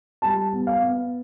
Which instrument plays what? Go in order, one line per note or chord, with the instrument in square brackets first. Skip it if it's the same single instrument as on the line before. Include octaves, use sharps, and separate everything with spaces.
[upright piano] G3 A5
B3
F5
B3